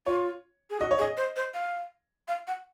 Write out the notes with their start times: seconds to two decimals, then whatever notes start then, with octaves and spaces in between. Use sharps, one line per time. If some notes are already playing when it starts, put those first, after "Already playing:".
0.06 F4 C#5
0.70 G#4
0.80 F#4 D#5
0.91 C#5
0.98 G#4
1.01 D#5
1.17 C5
1.36 C5
1.54 F5
2.28 F5
2.47 F#5